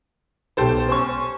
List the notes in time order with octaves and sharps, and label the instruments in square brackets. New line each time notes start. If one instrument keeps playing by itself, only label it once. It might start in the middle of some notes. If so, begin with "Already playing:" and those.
[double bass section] B1 [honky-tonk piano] G4 A4 C5
[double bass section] C#4 [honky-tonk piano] C5 C#6